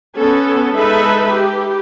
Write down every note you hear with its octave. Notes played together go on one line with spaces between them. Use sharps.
B3 C#4 A4
G#3 D#4 A4 B4 E5 B5
G4